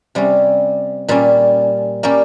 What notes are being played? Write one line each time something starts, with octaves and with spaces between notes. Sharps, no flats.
C3 G3 C#4
A#2 G3 C#4
G3 A#3 C#4 G4